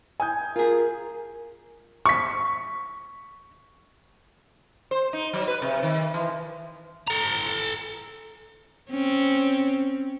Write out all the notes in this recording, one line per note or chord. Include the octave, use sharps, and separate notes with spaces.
G#5 D#6 G6
F4 G#4 A#4
C#6 B6
C5
D#4
F#3
B4
C3
D#3
E3
A4 A#5
C4 C#4